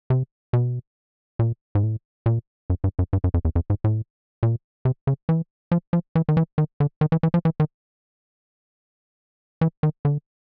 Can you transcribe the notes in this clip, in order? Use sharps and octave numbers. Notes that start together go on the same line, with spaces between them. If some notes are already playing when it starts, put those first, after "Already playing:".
C3
B2
A#2
G#2
A2
A#2
F#2
G2
F#2
G2
F#2
F2
E2
F2
G#2
A2
A#2
C3
C#3
E3
F3
F3
E3
D#3
E3
D#3
D3
D#3
E3
E3
F3
E3
D#3
E3
D#3
D3